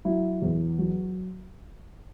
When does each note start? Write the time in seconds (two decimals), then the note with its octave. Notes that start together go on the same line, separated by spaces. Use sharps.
0.05 F#3 E4
0.42 E2
0.78 F#3